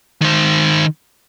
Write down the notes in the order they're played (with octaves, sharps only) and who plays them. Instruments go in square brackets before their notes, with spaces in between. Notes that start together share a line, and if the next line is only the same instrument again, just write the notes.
[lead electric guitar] D#3 C5